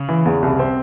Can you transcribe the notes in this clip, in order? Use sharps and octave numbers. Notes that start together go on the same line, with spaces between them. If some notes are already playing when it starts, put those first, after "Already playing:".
Already playing: C#3
E3
E2
C2
C4